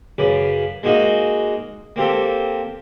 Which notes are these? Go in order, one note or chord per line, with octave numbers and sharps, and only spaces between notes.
F#2 C#3 B4 D6
G#3 A#3 D#4 F#4 D#5
A#3 C4 G4 A4